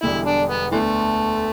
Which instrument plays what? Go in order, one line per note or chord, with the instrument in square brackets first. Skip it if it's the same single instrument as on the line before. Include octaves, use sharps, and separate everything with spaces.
[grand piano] E1 E2 D3 G3 [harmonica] E4
[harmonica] D4
B3
[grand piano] D2 D3 B3 [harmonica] E3 A3